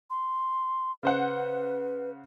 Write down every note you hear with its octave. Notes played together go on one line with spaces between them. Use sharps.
C6
C#3 B4 C5 F#5